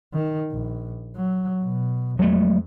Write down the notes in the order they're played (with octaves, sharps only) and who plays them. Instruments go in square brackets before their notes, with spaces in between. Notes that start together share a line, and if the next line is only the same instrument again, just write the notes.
[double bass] D#3
A#1
F#3
B2
[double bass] F2 [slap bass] F#3 G#3 A3